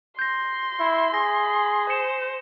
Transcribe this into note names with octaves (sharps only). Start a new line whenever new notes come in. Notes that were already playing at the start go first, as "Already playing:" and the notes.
C6 G6 A#6
E4
G#4 A#6
C5 C#7 E7